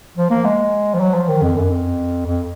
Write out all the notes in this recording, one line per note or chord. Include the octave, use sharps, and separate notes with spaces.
F3
A#3
G#3
F3
F#3
F3
D#3
F2
F#2
F2
F2